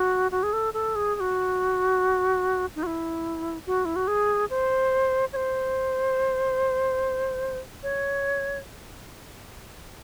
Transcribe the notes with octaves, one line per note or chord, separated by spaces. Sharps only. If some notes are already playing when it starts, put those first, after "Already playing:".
Already playing: F#4
F#4
G#4
A4
A4
G#4
G#4
F#4
D#4
F#4
E4
F#4
E4
F#4
G#4
C5
C#5
C5
C#5